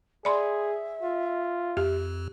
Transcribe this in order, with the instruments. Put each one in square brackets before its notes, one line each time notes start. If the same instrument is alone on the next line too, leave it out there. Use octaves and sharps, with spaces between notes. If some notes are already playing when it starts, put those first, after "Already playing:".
[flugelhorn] G#4 [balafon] D5 B5 C6 [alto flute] E5
[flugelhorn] F4
[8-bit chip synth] F2 [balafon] G4